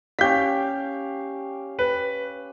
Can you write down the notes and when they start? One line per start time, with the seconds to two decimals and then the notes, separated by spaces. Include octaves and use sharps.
0.19 C#4 G4 F5 G6 B6
1.79 B4